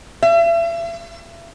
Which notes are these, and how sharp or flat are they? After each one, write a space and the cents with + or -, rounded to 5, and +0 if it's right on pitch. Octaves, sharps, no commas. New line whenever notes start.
E5 +40